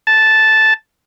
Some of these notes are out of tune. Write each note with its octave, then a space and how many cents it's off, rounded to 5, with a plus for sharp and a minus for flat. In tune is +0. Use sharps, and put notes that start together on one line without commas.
A5 -5